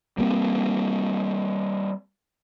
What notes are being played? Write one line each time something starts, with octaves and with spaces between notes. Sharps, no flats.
G3 A#3 C4